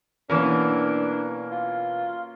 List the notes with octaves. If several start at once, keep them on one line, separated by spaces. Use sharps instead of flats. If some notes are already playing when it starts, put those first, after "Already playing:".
B2 E3 A#3 C#4 D4 A#4
F4